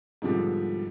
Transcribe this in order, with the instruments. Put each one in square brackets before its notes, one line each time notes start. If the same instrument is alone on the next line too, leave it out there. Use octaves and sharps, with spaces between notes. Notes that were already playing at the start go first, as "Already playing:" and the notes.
[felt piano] G#2 B2 D3 F3 G3 G4